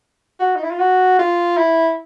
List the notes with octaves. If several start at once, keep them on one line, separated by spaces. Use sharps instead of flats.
F#4
D#4
E4
F4
F#4
F4
E4